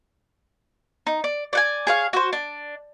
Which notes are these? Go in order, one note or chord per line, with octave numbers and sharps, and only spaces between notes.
D#4
D5
D5 F#5 G#5
G#4 C#5 F5
F#4 C5
D4